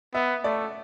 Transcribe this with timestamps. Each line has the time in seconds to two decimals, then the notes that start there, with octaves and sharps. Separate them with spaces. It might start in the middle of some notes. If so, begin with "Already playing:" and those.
0.14 B3 E5
0.44 A3 D5